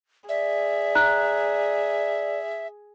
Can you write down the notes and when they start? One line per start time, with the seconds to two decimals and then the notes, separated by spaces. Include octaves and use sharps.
0.29 G#4 D5 E5
0.95 A#5 F#6